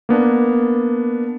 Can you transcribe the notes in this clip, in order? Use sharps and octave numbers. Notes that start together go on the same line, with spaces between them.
A#3 B3 D4